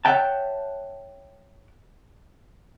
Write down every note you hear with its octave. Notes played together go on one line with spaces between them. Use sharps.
C#5 D5 E5 F#5 G5 A5